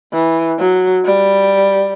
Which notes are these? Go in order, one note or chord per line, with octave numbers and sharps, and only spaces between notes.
E3
F#3
G3